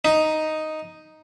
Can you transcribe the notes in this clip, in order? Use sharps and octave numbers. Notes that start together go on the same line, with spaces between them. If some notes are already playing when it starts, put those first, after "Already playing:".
D#4